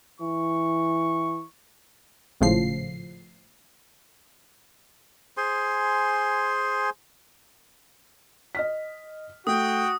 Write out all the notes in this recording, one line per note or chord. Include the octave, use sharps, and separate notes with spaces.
E3 C#6
G#1 A2 C#3 F3 C7
G#4 C5 G#5 C6
D#5 F6 B6
A3 F#4 G5 D#6